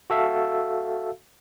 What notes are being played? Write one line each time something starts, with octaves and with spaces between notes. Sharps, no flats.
F#4 A4 E5 F5